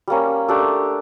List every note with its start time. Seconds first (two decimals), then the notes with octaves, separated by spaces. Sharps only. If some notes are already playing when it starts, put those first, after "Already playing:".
0.08 G3 A#3 C#4
0.48 A3 D4 G4